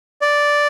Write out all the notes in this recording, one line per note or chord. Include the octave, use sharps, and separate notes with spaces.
D5